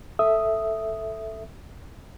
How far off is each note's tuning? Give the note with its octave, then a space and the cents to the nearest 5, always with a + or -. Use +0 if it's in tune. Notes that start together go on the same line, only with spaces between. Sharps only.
A4 +0 E5 +0 D#6 +0